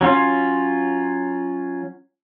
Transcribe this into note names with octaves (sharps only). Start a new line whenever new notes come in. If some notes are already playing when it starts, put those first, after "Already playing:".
F#3 C#4 F4